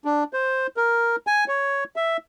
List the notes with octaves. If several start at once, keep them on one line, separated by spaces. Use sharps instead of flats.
D4
C5
A#4
G#5
C#5
E5